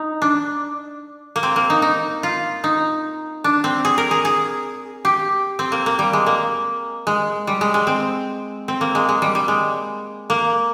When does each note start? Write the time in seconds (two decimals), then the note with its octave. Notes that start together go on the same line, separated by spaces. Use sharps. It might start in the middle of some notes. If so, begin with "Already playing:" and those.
Already playing: D#4
0.22 D4
1.36 A#3
1.43 C4
1.56 A#3
1.70 D#4
1.82 D#4
2.23 F4
2.64 D#4
3.44 D4
3.64 C4
3.85 G#4
3.98 A#4
4.11 G#4
4.25 G#4
5.05 G4
5.59 C4
5.72 A#3
5.86 A#3
5.99 G3
6.13 G#3
6.26 A#3
7.07 G#3
7.47 G3
7.61 G#3
7.74 G#3
7.87 C4
8.68 C4
8.81 A#3
8.95 G#3
9.09 G#3
9.22 G3
9.35 G3
9.48 G#3
10.30 A#3